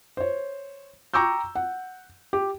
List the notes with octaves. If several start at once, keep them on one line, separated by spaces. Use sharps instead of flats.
C5 C#5
G5 A#5 C#6 D6 E6 G6
F#5
G4